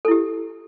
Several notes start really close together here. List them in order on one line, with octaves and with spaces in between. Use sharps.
A4 E4 G4